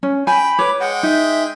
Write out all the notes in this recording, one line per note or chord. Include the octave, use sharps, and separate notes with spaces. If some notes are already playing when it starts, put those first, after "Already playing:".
C#4
G5 G#5 B5
B4 C#5 D6
G#3 F#5 G5
D#4 E5